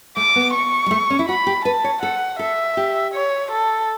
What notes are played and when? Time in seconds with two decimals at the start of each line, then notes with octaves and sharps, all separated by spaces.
0.17 A3 D6
0.36 B3
0.54 C#6
0.86 G3
0.91 A3
1.10 C#4
1.19 E4
1.28 F#4 B5
1.47 G4
1.65 B4 A5
1.84 C#5
2.02 A4 F#5
2.39 A4 E5
2.77 G4
3.14 C#5
3.51 A4